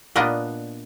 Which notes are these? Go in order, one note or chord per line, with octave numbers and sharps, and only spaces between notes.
A#2 A#3 B3 D4 D#5